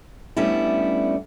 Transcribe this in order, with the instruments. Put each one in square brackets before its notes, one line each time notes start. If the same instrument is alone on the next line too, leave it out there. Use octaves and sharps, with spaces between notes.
[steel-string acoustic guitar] G3 A3 B3 C#4 D4 E4